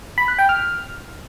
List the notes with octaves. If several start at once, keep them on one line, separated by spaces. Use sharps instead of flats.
B5
F#6
G5
F6